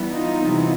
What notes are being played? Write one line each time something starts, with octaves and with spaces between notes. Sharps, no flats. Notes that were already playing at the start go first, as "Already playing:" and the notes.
Already playing: E3 G3 B3
D#4 F4
C3 E3 G3 B3